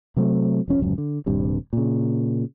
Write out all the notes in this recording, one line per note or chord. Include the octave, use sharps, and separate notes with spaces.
C3 F#3 A3 C4
E1 F3 C#4
D1 C#2 F#2
D3
D#1 G2 C3
A#2 C#3